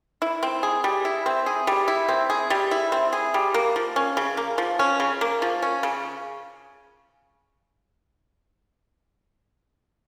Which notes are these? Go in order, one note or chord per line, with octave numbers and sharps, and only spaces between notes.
E4
C4
G#4
G3
E4
C4
G#4
G3
E4
C4
G#4
G3
E4
C4
G#4
G3
A#3
F3
C#4
C#3
A#3
F3
C#4
C#3
A#3
F3
C#4
C#3